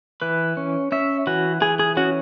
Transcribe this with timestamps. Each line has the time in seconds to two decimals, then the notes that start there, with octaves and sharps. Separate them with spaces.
0.22 E3 B4
0.57 C#4
0.92 C#4 E5
1.27 E3 F#4
1.61 E3 G#4
1.79 G#4
1.97 C#4 F#4